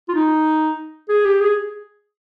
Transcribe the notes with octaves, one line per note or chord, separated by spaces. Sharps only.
F4
D#4
G#4
G4
G#4